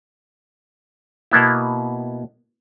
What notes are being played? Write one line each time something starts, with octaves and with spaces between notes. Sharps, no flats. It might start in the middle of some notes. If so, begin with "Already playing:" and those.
B2 A#3 B3 E4